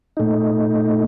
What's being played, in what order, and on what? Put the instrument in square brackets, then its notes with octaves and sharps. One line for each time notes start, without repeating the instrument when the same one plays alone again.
[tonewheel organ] A#2 A3 D#4